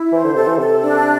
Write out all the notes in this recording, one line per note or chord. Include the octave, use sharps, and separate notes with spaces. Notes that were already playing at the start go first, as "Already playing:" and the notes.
Already playing: E4
E3 C5
D3
C3 A4
E3
C3 A4
D4